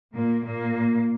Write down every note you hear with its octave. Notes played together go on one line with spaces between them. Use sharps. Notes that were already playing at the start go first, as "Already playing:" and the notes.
A#2 A#3
A#2 A#3